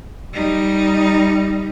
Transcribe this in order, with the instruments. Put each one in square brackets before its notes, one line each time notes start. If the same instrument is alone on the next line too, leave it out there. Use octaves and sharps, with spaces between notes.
[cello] G3 D#4